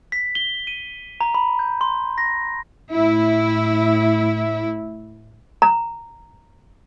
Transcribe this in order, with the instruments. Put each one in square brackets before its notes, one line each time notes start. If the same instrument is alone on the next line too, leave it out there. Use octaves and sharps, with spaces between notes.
[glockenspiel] B6
G7
D#7
A#5
B5
G6
C6
A#6
[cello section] A2 E4
[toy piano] A#5